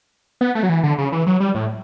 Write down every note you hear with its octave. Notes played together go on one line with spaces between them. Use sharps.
B3
A3
F#3
E3
D3
C#3
E3
F#3
G3
A2